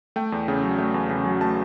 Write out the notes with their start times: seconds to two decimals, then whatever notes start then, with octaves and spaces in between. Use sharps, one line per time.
0.16 A3 G5
0.32 E2
0.48 C#3
0.63 F#3
0.78 A3
0.94 E2
1.10 C#3
1.25 F#3
1.40 A3 A5